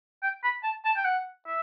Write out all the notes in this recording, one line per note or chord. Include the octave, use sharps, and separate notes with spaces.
G5
B5
A5
A5
G5
F#5
E5